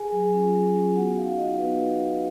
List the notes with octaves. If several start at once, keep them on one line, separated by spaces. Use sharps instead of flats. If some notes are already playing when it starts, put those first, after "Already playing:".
Already playing: G#4 G#5
F#3
C#4 F4
F#3
C#4 F4
B3 F#4 F#5
D#4 F4 F#4 F5
B3 D#4 D#5
B3 D#4 F#4 B4